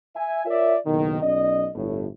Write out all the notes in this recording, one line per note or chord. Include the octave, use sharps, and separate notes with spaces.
E5 G#5
F4 A#4 C#5 D5 E5
F#1 B1 B2 D#3
B1 C#4 D5 D#5
G1 A2